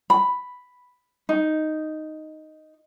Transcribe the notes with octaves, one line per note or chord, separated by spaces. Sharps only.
B5
D#4